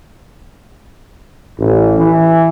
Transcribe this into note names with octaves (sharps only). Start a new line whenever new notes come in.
A1
E3